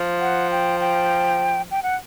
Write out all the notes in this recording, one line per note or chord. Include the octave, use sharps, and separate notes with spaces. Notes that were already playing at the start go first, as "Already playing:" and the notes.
Already playing: F3
F#5
G5
G5
G5
F#5